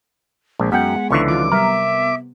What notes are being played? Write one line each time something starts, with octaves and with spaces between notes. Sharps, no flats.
A#1 G#3
F#2 B3 F#5 G5 B6
C#2 D3 E3 C#6
D#3 F#3 F4 B4 D6
C3 G3 B3 A#4 E5